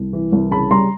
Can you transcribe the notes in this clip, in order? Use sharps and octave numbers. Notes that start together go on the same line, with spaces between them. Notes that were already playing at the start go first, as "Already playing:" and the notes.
Already playing: C2
E3
C2
C#3 A5 B5
G3 A#5 C6